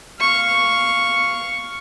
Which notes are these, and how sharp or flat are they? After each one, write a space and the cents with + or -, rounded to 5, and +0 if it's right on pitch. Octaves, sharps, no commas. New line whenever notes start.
F5 +0 C#6 +0